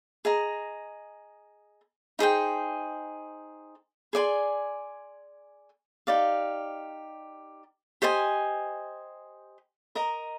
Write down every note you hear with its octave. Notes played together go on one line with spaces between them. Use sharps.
G#4 D#5 A#5
D#4 G#4 C5 G5
G#4 D5 G#5 C6
D#4 G4 D5 F5
G4 C5 D#5 G#5
A#4 D#5 A#5